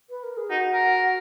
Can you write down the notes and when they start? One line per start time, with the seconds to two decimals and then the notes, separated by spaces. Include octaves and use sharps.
0.10 B4
0.23 A#4
0.37 G#4
0.50 D#4 F#4
0.73 A#4